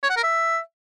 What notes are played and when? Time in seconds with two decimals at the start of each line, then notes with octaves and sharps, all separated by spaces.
0.03 C#5
0.10 F#5
0.17 A#4
0.24 E5